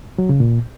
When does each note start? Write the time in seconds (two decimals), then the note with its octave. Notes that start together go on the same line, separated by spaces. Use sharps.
0.18 F#3
0.29 C#3
0.40 A#2